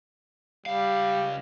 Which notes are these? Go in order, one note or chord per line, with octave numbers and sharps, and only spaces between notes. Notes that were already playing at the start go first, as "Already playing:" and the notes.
C#2 G3 F5